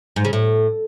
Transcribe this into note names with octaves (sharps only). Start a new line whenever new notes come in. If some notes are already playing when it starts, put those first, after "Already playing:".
G#2
C#3
A2